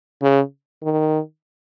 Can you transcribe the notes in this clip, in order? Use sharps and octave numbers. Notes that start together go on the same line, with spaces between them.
C#3
D#3